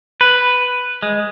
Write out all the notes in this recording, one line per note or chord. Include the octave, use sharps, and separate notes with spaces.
B4
G#3